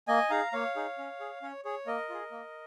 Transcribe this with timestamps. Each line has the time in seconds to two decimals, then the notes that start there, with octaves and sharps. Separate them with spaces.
0.07 A#3 D#5 G#5
0.30 D#4 G#4 F5 A#5
0.52 A#3 C#5 F5
0.76 D#4 G#4
0.98 C#4
1.20 G#4
1.42 C#4 C#5
1.65 G#4 C#5
1.87 A#3 A#4 D#5
2.09 F4 G#4
2.31 A#3